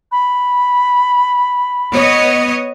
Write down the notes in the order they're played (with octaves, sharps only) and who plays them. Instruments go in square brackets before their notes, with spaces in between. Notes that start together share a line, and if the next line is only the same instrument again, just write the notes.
[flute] B5
[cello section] B3 C#5 D#5